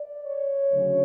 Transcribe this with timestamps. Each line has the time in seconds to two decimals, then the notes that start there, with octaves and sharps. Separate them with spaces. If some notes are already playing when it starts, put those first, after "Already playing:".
Already playing: D5
0.25 C#5
0.70 D2 C#3 F#3 C#4